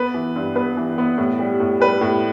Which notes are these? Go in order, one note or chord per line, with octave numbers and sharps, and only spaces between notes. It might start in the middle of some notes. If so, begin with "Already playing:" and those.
Already playing: B3 B4
E3
G2
B3 B4
E3
B3
A2
G3
A2
G3 B4
A2